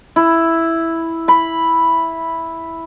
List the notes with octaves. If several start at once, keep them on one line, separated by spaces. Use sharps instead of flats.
E4
B5